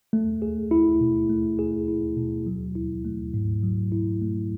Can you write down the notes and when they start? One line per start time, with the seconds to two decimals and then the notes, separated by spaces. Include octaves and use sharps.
0.13 A3
0.42 G#4
0.71 E4
1.01 B2
1.29 A3
1.59 G#4
1.88 E4
2.17 B2
2.46 F#3
2.75 E4
3.05 A3
3.34 G#2
3.63 F#3
3.92 E4
4.22 A3